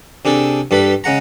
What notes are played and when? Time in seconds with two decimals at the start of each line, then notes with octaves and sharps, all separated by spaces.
0.25 C3 D4 G#4 A4
0.71 G2 G3 A4 B4 B5
1.04 C#3 G#3 F#5 A#5